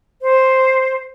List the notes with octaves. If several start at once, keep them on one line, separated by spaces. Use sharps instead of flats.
C5